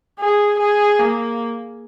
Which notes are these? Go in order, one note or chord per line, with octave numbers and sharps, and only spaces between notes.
G#4
G#4
A#3